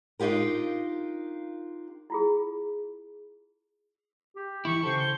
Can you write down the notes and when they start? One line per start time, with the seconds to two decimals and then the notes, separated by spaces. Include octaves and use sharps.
0.19 D4 D#4 F4 G4 A#4
2.10 E4 F4 G#4
4.36 G4
4.65 E3 E4 C#6
4.83 C#3 G4 A4 C5
5.00 G7